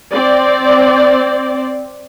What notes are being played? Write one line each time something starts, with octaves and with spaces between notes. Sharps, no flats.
C4 D5